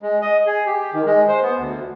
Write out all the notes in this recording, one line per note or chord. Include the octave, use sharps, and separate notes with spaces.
G#3
D#5
G#4
G4
D#3
G#3
C5
B3
D2